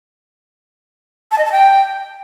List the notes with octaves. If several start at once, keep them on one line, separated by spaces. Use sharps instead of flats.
A5
D#5
A5
G5